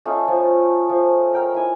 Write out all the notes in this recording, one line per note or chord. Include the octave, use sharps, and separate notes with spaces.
A3 C#4 D#4 F4
F3
F3
A#4 G5 A#5
E4 G#5